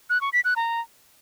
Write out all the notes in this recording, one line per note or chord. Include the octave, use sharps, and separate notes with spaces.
F#6
C#6
B6
F#6
A#5